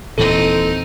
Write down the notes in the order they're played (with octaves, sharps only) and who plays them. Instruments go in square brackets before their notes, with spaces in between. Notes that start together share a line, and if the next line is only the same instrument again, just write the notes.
[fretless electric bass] D#1 A#2 E3 [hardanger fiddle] C4 D#4 [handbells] A4